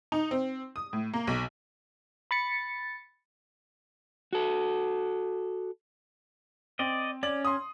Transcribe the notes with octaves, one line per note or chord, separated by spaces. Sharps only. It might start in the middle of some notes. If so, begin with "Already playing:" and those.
D#4
C4
D#6
A2
A#3
B1
B5 A6 C#7
F#4 A4
C4 D5 D#5
C#4 D5 F#7
C6 D#6